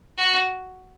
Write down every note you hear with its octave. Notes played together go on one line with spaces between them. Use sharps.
F#4